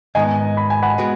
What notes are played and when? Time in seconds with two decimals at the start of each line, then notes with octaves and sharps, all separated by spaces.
0.15 G#2 D#3 G#3 B3 D#5 G#5
0.57 B5
0.70 G#5
0.82 F#5 B5
0.98 G#3 B3 F#4 B4